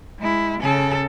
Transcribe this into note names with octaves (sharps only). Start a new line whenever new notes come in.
G#3 E4
C#3 A4